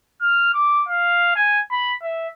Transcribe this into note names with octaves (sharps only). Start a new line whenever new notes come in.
F6
D6
F5
G#5
B5
E5